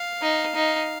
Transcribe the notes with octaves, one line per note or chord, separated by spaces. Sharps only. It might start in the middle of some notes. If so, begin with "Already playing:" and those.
Already playing: F5
D#4
D#4